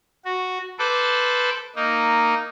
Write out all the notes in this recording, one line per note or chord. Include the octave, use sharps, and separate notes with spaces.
F#4
A4 B4 C5 D6
A#3 D#4